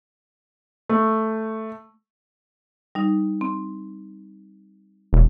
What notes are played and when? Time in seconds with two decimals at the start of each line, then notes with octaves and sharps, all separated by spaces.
0.89 A3
2.95 G3 D#4
3.41 C4
5.13 E1